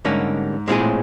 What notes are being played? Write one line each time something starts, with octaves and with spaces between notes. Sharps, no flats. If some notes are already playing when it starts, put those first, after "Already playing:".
G#2 D3 G3 A#3 C#4
A#2 G#3 C4 E4 G#4
A2